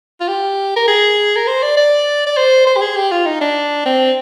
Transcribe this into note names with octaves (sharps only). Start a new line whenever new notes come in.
F4
G4
A#4
G#4
A#4
C5
D5
D5
D5
C5
C5
G4
G#4
G4
F4
D#4
D4
C4